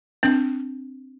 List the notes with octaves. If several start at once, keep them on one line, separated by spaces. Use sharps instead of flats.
C4 D4